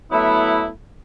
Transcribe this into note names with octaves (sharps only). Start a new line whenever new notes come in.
F#3 A3 B3 E4